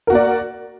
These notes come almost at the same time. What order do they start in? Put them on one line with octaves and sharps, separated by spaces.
A#4 F#4 A#3 D5